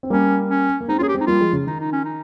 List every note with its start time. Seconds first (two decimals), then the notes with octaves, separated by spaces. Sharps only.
0.03 C4
0.10 G3 A#3 C#4
0.49 C#4
0.81 A#3
0.88 G#3 C4 D#4
0.98 A#3 C#4 F4 G#4
1.08 G4
1.14 G#3 C4
1.21 D#4
1.27 G3 A#3 F4
1.40 F3 G#3
1.53 C#3
1.67 D#3 D#4
1.80 D#4
1.92 C#4
2.05 D#4